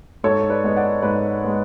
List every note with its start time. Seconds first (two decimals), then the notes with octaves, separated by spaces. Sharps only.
0.24 G#2 A4 C#5
0.50 B4 D5
0.64 G#3 B3
0.76 D5 F#5
1.02 G#2 B4 D5
1.43 G#3 B3